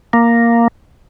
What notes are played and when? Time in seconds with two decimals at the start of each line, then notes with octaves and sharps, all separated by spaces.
0.13 A#3